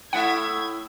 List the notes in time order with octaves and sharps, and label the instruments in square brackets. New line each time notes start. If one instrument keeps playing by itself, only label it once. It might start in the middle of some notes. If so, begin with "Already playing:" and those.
[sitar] A2 E4 E5 [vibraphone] A3 A4 D#6 [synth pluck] F#5 [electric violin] G#6